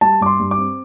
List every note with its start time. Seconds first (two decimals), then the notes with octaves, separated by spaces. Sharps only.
0.01 G3 A5
0.21 G2 D6
0.26 C6
0.40 G2
0.51 D6
0.57 C4